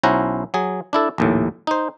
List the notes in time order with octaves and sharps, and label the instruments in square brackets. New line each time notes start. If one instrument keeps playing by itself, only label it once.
[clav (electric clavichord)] B1 C#4 E4 C5 F#5 A#5
F#3 G#4
D4 E4 A4
A#1 D#2 A2
D#4 C5